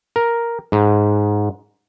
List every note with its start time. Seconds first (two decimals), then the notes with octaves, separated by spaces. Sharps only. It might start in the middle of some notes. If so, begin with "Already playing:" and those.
0.16 A#4
0.72 G#2